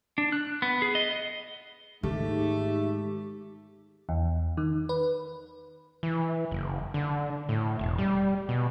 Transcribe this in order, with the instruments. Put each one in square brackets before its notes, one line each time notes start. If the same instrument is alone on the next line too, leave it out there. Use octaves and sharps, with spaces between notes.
[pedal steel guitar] D4
F#6
B3
G#4
D#5
D#5
[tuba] G#2 [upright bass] D#3 [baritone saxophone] A3 [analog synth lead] G4
[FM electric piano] E2
D#3
B4
[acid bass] E3
F#1
D3
A2
E1
G3
B2